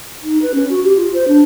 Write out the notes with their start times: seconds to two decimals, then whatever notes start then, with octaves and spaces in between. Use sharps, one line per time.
0.23 D#4
0.42 B4
0.54 C#4
0.69 F#4
0.83 G4
0.96 F4
1.14 C5
1.27 D4